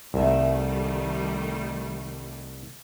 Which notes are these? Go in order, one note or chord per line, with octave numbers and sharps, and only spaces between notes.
C2 D#3 G3 A3 G#4 E5